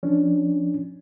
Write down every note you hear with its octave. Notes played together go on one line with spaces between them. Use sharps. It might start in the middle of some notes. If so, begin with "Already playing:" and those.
F3 C#4 D4